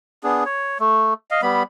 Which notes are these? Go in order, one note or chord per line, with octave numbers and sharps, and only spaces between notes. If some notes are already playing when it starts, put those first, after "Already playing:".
B3 D4 G#4
C#5
A3
D#5 F5
G3 B3 B5